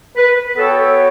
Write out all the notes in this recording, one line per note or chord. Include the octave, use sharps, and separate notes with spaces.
B4
B3 F#4 A4 C#5 G5